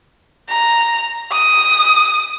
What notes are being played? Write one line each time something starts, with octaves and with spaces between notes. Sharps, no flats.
A#5
D#6